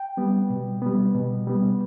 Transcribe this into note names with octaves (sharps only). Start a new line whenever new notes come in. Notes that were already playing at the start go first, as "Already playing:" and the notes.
Already playing: G5
G3 B3
B2
G3 B3
B2
G3 B3